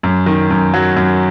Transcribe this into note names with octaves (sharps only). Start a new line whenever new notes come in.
F#2
D#3
F#2
F#3
F#2